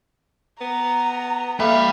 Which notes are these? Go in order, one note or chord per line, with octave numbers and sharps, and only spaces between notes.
B3 A#5
A#3 A4 E5 F5 G5 B5